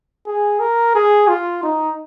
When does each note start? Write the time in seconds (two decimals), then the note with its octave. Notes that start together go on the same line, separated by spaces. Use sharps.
0.26 G#4
0.60 A#4
0.95 G#4
1.28 F4
1.63 D#4